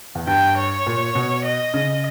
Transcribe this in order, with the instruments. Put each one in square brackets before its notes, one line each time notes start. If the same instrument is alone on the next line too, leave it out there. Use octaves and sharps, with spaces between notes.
[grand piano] E2
[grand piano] G2 [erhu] G5
[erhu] C#5
[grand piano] A#2
B2
[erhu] D#5
[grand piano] C#3